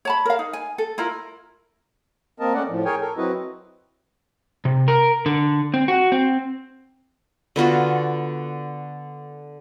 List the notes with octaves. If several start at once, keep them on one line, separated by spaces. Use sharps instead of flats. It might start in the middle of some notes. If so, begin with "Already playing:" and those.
C#5 A5 B5
A#4 F5
D#4
G#5
A4
E4 F4 A#4
A#3 C4 A#4 D#5 A5
A3 C#4 D5 F#5
A2 F3
G#4 A#4 C#5 G5 G#5
A4 A#4
F#3 C4 E4 F#4 B4 D#5
C3
A#4
D3
C4
F#4
C4
D3 B3 F4 F#4